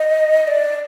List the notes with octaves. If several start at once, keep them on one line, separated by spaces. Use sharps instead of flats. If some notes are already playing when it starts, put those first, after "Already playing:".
Already playing: D#5
D5